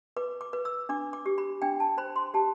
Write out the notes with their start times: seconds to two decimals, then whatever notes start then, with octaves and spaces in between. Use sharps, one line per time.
0.16 B4 D6
0.41 D6
0.53 B4
0.65 E6
0.89 D4 D6
1.13 D6
1.26 G4
1.38 B5
1.62 D4 G5
1.80 A5
1.98 C5 B5
2.16 C6
2.34 G4 A5